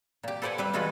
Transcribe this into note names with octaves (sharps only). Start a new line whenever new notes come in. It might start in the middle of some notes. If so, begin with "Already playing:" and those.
A#2 G4
A4 B4 C5 D5 F#5 G#5
G3 B4 E5
E3 G#3 F4 F#4 A4 B4